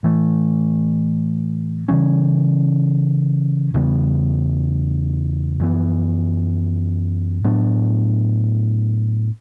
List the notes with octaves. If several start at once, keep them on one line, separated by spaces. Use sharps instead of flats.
A2 E3 A3
C#3 E3 G3 C#4
E2 C#3 G3 B3
F#2 E3 B3
A2 F#3 B3 D4